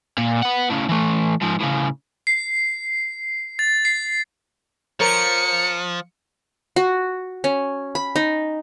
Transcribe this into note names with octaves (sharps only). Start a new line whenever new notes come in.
A#2
B4 F#5
A2 C#3
E3 A3
G#2 F3
A2 C#3
C7
A6
C7
F3 A#4 C5 C#5 C#7
F#4
C#4
B5
D#4